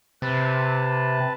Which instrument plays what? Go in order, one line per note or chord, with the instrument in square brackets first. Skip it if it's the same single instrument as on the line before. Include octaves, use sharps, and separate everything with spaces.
[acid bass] C3 [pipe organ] B4 A5